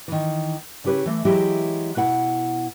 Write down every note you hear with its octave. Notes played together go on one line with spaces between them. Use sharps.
D#3 E3
C#3 E4 G4 B4 C#5
E3 A3
E3 F#3 G#3 E4 G4
B2 E4 F#5